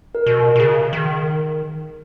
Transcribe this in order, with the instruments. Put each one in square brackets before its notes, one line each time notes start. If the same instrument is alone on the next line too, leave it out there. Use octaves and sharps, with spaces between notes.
[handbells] A#4
[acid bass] B2
[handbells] A#4
[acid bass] B2
[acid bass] C#3 [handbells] G#4
[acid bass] D#3